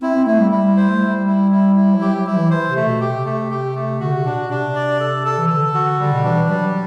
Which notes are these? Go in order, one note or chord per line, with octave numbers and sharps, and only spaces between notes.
C4 E4
C4
A3 E4
G3
E4
C5
A3
G3 E4
E4
E4
E4
F#3
G3 G4
F#3
E4
E3
C5
C3
A3
B2
C3 G4
A3
G4
A3
D3 F#4
C3
B2 D4
B2
C3 D4
D5
A4
A4
E3
D3 A4
F#4
D3 G3
B2
E3 D4
E3
F#3 G3